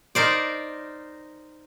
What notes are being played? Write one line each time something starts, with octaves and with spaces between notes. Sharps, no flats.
D#4 A#4 C5 D5